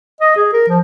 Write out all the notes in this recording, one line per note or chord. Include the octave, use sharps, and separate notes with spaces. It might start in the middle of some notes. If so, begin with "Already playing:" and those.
D#5
G#4
A#4
F3